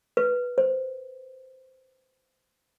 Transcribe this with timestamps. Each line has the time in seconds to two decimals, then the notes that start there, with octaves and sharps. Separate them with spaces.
0.17 B4
0.58 C5